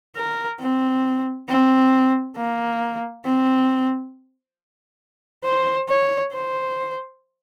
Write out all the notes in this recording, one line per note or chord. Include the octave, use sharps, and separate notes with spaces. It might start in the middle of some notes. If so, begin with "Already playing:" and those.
A#4
C4
C4
A#3
C4
C5
C#5
C5